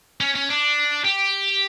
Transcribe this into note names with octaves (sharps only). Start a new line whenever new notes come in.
C#4
C#4
D4
G4